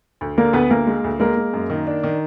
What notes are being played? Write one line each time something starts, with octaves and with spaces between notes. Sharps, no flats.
D2
D3 A#3 A#4
D2 B3 B4
D2 A#3 A#4
G#3
D2
G#3 A#3 A#4
G#3
F#2
D#3
D4
D#3